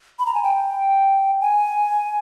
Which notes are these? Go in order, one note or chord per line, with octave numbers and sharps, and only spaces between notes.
B5
A#5
G#5
G5
G#5